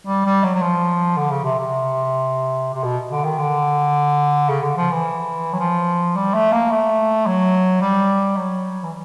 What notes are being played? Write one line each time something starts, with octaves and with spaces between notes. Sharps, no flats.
G3
G3
F#3
F#3
F3
D3
C#3
C3
C3
C3
B2
D3
D#3
D3
C#3
D3
F3
E3
F#3
F3
G3
A3
A#3
A3
F#3
G3
F#3
E3